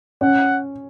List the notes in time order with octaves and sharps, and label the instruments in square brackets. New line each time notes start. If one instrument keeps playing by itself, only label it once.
[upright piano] C#4 [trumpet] F#5